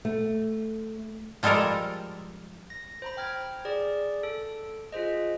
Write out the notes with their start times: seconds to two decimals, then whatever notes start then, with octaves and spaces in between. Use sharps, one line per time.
0.05 A3
1.43 F3 G3 G#3 A4 A#4
2.70 A#6
3.02 C5 A#5 B5
3.17 G5 F6 G#6
3.65 G#4 D5
4.23 A4
4.92 F4 G#4 C5 D#5